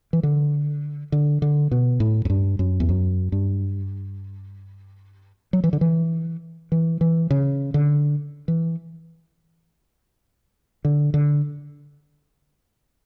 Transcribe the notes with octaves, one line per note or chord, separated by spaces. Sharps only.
E3
D3
D3
D3
B2
A2
F#2
G2
F#2
E2
F#2
G2
F#3
E3
D3
E3
E3
E3
C#3
D3
E3
D3
D3